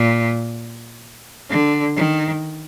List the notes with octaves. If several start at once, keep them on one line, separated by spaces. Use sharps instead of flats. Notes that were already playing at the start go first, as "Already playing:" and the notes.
Already playing: A#2
D3
D#3